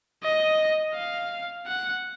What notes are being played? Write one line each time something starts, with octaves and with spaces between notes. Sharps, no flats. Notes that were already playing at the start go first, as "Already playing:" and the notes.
D#5
F5
F#5